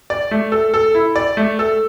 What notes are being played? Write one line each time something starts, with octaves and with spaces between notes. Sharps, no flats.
D5
A3
A4
A4
E4
D5
A3
A4